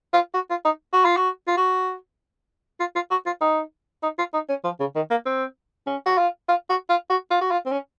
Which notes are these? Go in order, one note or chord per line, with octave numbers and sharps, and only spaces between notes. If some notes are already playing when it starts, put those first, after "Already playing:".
F4
F#4
F4
D#4
F#4
F4
F#4
F4
F#4
F4
F4
F#4
F4
D#4
D#4
F4
D#4
C#4
F3
C#3
D#3
A#3
C4
C#4
F#4
F4
F4
F#4
F4
F#4
F4
F#4
F4
C4
C#4